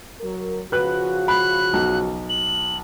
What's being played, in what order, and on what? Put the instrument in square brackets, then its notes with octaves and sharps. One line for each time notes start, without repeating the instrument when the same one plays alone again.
[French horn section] F#3 A#4
[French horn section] C#3 F3 F#4 [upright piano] B4 F#6
[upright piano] B5 [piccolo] F#6
[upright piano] B1
[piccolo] F#7